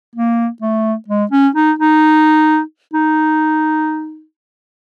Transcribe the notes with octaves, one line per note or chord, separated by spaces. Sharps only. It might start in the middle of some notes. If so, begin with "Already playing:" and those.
A#3
A3
G#3
C#4
D#4
D#4
D#4